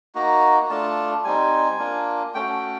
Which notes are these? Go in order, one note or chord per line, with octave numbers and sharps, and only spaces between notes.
A#3 D#4 F#4 A#5
A3 D4 F4 A5
G3 C4 D#4 G#5
A#3 D4 F4
A3 C#4 F#4 G5